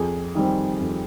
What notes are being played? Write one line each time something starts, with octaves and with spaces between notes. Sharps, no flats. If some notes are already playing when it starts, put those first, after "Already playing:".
Already playing: F2 G#4
D#3 G3 C4
F2